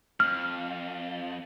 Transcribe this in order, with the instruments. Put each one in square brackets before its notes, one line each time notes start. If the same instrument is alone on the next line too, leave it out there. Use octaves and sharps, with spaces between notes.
[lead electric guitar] F2 [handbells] F6